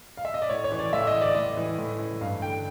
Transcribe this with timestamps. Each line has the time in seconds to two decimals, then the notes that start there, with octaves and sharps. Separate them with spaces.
0.17 F5
0.25 E5
0.34 D#5
0.42 D5
0.49 A2 C#5
0.64 C#5
0.72 E3
0.79 D5
0.93 A2 E5
1.07 D#5
1.14 E3
1.21 D5
1.35 A2 D#5
1.57 E3
1.78 A2
1.99 E3
2.21 G2 F5
2.42 D3 G5